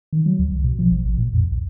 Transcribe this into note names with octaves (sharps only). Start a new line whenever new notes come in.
D#3
F#3
D2
C2
B2
F3
G#1
A1
A#2
F2
B1